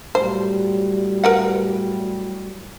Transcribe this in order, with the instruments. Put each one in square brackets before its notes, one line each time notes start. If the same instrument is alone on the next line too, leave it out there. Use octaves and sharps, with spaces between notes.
[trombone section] A2 F#3 G3 [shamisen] C5
[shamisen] A#4 B4 F#5